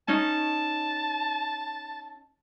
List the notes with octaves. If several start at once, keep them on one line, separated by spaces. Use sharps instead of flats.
C#4 D#4 A5